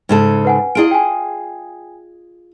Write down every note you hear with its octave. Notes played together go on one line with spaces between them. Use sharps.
G#2 C#3 A4
B4 F#5 G#5
E4 F4 G#4 D#5 D7
G5 G#5